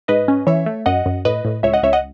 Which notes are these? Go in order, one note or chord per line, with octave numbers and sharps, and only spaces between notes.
G#2 B4 D#5
C#4
E3 C#5 E5
A3
F#2 D#5 F#5
F#2
A2 B4 D#5
A2
C#2 C#5 E5
D#5 F#5
C#2 C#5 E5
D#5 F#5